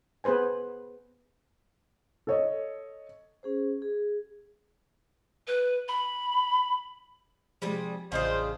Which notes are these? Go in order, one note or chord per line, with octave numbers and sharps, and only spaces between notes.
B3 G#4 B4 C5 G#5
A4 C#5 D#5
C#4 G#4 C5
G#4
B4
B5
C3 F3 G3 G#3 G#4
A1 C#3 D4 F4 C5 D#5 D#6